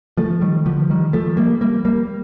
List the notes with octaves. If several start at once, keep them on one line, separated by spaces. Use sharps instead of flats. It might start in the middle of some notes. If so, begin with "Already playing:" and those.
F3 A3
D#3 G3
D3 F3
D#3 G3
F3 A3
G3 A#3
G3 A#3
G3 A#3